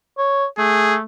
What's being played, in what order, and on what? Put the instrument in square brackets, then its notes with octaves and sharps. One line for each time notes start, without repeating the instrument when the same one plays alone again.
[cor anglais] C#5
[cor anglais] A3 [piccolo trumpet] G#4